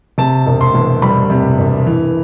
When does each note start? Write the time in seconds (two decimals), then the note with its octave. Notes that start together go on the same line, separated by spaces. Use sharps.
0.18 C3 A5
0.46 E1
0.61 C6
0.74 E2
1.02 G3 B5
1.30 C3
1.58 E1
1.86 E3